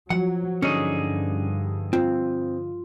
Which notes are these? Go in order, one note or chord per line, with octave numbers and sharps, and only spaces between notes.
F3 F#3 F#5
G2 D3 C#4 D#4 G#4
C4 F4